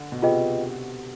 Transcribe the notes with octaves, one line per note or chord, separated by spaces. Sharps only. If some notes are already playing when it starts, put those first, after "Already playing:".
Already playing: D3
B2
C3 F4 G#4 B4 D#5 G5